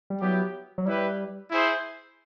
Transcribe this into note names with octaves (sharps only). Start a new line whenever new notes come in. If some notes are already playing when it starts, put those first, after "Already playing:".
G3
F#3 B3 E4 G4
F#3
G3 E4 G4 B4
E4 G#4 C5